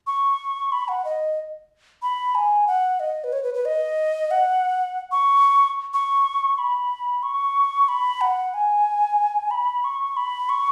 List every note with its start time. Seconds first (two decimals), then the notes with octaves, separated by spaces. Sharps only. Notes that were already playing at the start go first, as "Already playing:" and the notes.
0.07 C#6
0.72 B5
0.88 F#5
1.05 D#5
2.02 B5
2.35 G#5
2.67 F#5
3.00 D#5
3.24 B4
3.33 C#5
3.43 B4
3.54 B4
3.65 D#5
4.31 F#5
5.12 C#6
5.94 C#6
6.58 B5
7.23 C#6
7.89 B5
8.21 F#5
8.54 G#5
9.51 B5
9.84 C#6
10.17 B5
10.49 C#6